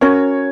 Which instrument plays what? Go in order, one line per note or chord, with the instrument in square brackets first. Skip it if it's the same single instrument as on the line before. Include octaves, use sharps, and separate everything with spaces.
[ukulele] C#4 F#4 A#4 [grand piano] C#5